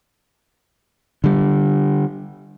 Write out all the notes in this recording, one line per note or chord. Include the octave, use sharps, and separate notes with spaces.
D3 G3